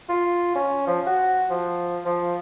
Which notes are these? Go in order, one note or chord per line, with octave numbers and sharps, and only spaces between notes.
F4
C#4
F3
F#4
F3
F3